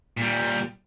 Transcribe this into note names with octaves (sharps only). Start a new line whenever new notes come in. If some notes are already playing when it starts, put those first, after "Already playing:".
A#2 G3